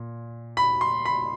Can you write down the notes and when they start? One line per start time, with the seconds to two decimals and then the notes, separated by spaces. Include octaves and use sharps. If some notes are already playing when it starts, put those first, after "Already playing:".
Already playing: A#2
0.57 B5
0.81 C6
1.05 B5